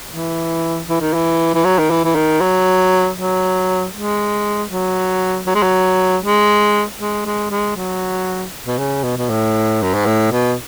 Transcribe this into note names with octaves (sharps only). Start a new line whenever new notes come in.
E3
E3
D#3
E3
E3
F#3
D#3
E3
E3
D#3
F#3
F#3
G#3
F#3
F#3
G#3
F#3
G#3
G#3
G#3
G#3
F#3
B2
C#3
B2
B2
A2
F#2
G#2
A2
B2